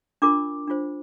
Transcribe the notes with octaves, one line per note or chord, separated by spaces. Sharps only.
D4 F4 A#4 D6
D4 F4 C5